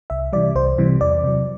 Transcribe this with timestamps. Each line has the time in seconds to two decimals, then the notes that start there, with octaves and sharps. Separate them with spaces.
0.10 C2 E5
0.33 C3 E3 G3 D5
0.55 C2 C5
0.78 C3 E3 G3
1.01 E2 D5
1.24 C3 F#3